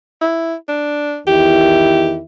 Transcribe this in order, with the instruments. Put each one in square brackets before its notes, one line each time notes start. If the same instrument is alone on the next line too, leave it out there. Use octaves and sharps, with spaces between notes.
[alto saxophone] E4
D4
[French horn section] E2 D#3 E4 [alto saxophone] G4